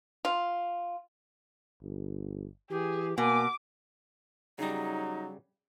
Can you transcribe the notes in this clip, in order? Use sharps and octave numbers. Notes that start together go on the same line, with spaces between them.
F4
G1
E3 G4 G#4
B2 A#3 G#5 D6
C#3 F#3 G3 D#4